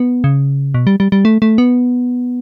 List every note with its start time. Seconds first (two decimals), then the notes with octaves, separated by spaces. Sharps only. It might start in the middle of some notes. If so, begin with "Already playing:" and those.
Already playing: B3
0.24 C#3
0.74 B2
0.87 G3
1.00 G3
1.12 G3
1.25 A3
1.42 A3
1.58 B3